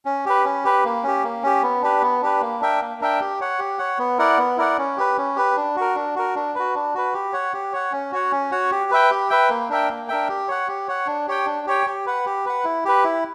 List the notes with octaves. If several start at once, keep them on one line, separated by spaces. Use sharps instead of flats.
C#4
G4 B4
C#4
G4 B4
A#3
C#4 G4
A#3
C#4 G4
B3
D4 G4 B4
B3
D4 G4 B4
A#3
D4 A#4 E5 G5
A#3
D4 A#4 E5 G5
G4
C#5 F#5
G4
C#5 F#5
B3
E4 A#4 D5 F#5
B3
E4 A#4 D5 F#5
C#4
G4 B4
C#4
G4 B4
D4
F#4 A#4
D4
F#4 A#4
D4
F#4 B4
D4
F#4 B4
G4
C#5 F#5
G4
C#5 F#5
C#4
F#4 C#5 F#5
C#4
F#4 C#5 F#5
G4
B4 E5 G5
G4
B4 E5 G5
A#3
D4 A#4 E5 G5
A#3
D4 A#4 E5 G5
G4
C#5 F#5
G4
C#5 F#5
D4
G4 C#5 G5
D4
G4 C#5 G5
G4
B4 F#5
G4
B4 F#5
E4
G4 B4
E4